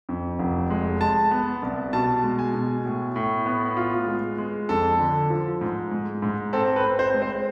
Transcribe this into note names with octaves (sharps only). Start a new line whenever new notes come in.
F2
F1
G#3
G#3 A5
B3
C2
B2 A5
G#3
G#5
B2
A2
A2
B3
F4
G#3
G#3
F2 A4
D3
F3
G#2
G#3
G#2
C4 A4
B4
C4
C5
G#3
C5